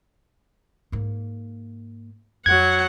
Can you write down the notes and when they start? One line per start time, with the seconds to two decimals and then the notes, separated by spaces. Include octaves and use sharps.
0.92 G#2 A#3
2.46 F2 F#3 F#5 G#6